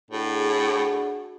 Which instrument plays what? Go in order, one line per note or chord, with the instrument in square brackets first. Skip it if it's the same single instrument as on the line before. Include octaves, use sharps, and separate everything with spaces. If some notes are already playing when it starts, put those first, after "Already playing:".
[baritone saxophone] A2 [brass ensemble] D4 F#4 G#4